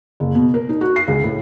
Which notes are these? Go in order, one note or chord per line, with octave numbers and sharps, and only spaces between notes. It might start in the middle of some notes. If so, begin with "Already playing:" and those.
F#1
B2
A#4
D#4
F#4
C7
C#2
A2